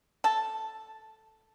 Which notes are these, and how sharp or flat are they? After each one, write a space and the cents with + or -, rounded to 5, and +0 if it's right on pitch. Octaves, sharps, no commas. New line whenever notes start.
A4 +0 A5 +0